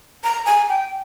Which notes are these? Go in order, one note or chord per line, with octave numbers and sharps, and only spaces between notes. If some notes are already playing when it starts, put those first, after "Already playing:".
A#5
G#5
G5